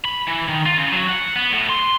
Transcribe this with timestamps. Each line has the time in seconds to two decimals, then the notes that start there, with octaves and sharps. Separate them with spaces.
0.05 B5
0.28 E3
0.48 D#3
0.66 F4
0.77 C#3
0.92 F#3
1.09 F#5
1.36 B3
1.52 A2
1.69 C6